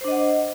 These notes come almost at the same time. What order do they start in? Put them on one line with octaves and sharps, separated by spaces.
C5 D4 D#5 F#5